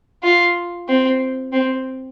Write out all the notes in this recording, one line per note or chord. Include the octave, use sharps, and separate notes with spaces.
F4
C4
C4